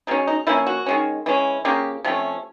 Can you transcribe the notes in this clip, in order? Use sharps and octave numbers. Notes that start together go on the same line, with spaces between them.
B2 G#3 C#4 D#4
D#4
F3 A#3 C#4 E4
F#4
D#3 G#3 C#4
E3 G#3 C#4
C#3 F3 A#3 C#4 G4
C3 F3 A3 C#4